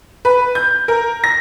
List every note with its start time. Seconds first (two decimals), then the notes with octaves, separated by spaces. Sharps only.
0.25 B4
0.55 G6
0.88 A#4
1.24 A#6